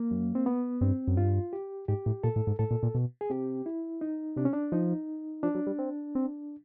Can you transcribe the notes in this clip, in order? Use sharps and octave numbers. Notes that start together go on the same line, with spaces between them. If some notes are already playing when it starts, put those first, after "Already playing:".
Already playing: A#3
F#2
C4
B3
G2 C4
F#2
G2 F4
G4
G#2 G4
A2
A#2 A4
A2
G#2
A2 A4
A#2
A#2
B2
G#4
C3 G4
E4
D#4
C3 D4
C#4
D4
F3 D#4
F3 D4
F#3
G3
C4
C4